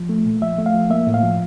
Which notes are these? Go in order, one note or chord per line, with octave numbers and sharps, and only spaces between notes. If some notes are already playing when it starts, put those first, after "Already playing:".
Already playing: F3
A3
A#2
F3 E5
A3
F5
F3
A#3 E5
A2
F5
F3